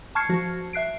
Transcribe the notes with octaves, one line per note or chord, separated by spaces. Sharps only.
A5 C#6 F6 G#6 C7 C#7
F3 F#4
E5 F#6 C7 D7